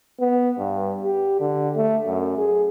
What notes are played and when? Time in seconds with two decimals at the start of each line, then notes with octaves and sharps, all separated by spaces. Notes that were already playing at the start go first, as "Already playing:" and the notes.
0.20 B3
0.58 G2
1.04 G4
1.40 D3
1.76 A3
2.07 F#2
2.38 G#4